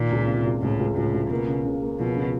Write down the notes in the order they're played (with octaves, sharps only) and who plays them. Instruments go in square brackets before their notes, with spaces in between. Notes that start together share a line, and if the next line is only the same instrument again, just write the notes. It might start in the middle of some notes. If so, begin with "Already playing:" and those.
Already playing: [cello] A#2 [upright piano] D#3
[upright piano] C#2
C3
C#2
[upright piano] C#2 [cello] A2
[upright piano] C#2
[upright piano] C#2 [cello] A2
[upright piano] C#2
[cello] B2 [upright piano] A#3
[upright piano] C#3
C#3
A#3
[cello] B2 [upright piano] F3
[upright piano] C#3